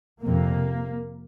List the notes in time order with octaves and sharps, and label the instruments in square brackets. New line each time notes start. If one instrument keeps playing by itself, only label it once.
[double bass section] F2 C3 A#3